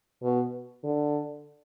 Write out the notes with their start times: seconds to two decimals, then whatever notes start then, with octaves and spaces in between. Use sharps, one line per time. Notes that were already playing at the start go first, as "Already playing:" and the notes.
0.23 B2
0.84 D3